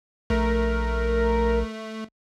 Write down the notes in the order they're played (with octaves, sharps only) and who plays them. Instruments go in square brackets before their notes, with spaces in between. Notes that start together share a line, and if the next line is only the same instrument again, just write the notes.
[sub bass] A#1 [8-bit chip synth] A3 [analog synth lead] A#4